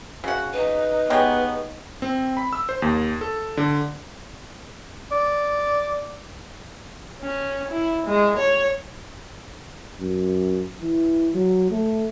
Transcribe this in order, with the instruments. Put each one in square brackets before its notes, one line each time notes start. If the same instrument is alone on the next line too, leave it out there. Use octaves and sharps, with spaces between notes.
[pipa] C#3 F#5 [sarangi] F#4
[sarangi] D#4 [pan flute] B4
[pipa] G#3 G4 C#5 [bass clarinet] B3
[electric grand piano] C4
B5
E6
C5
D#2
A4
D3
[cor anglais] D5
[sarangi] C#4
E4
G#3
C#5
[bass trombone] F#2
E3
F#3
A3